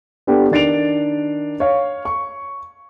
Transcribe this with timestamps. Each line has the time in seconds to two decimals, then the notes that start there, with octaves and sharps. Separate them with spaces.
0.27 B3 D4 G4 A4
0.51 D#3 D4 A6 C7 D7 F7
1.60 C#5 F5
2.05 C#6